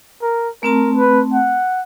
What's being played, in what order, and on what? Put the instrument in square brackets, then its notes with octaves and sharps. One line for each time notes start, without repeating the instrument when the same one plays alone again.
[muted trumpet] A#4
[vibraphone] A3 C4 A5 [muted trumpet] A#4
[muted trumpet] B4
F#5